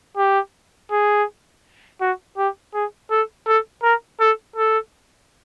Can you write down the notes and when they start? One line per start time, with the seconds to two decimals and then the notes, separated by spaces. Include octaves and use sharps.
0.17 G4
0.91 G#4
2.01 F#4
2.37 G4
2.74 G#4
3.11 A4
3.47 A4
3.83 A#4
4.20 A4
4.56 A4